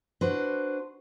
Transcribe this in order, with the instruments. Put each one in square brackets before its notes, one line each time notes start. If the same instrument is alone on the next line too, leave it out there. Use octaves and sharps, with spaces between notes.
[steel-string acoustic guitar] D4 F#4 B4 C5